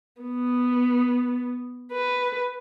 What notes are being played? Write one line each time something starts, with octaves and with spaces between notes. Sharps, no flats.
B3
B4